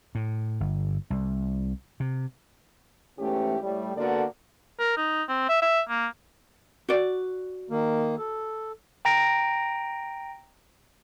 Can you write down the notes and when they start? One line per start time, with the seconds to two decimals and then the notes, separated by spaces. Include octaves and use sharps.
0.15 A2
0.60 G1
1.10 C2
2.00 C3
3.19 E2 G#2 E3 A3 C#4 G4
3.62 A2 G3
3.96 D3 A#3 B3 F#4 A4 D5
4.79 A#4
4.97 D#4
5.29 C4
5.49 E5
5.62 E5
5.89 A#3
6.89 F#4 D5
7.70 D#3 A#3
8.18 A4
9.05 G5 A#5 A#6 D7